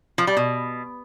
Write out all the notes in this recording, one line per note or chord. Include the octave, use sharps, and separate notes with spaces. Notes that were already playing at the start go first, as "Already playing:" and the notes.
F3
G3
B2